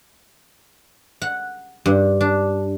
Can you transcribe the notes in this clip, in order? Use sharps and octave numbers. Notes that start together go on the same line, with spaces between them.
F#5
G2
D4